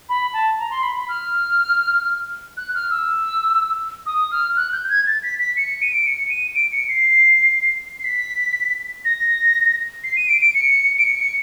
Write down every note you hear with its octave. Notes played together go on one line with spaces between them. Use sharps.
B5
A5
A#5
C6
B5
B5
F6
F#6
F6
E6
D#6
F6
F#6
G6
G#6
A6
B6
B6
C#7
D#7
D7
C#7
D#7
D7
C#7
C7
C7
B6
A#6
C7
D#7
D7
D7
C#7
D7
C#7
C#7